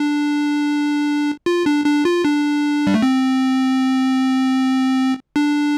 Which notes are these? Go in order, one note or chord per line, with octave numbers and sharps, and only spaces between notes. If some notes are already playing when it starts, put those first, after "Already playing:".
Already playing: D4
F4
D4
D4
F4
D4
G3
A3
C4
D4